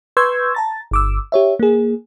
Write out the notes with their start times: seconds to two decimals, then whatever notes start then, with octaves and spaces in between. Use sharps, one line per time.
0.17 B4 C6 C#6 E6 G6 G#6
0.55 A5 A#5 A6
0.91 G1 D6 E6
1.32 G4 C#5 E5
1.59 A#3 G#4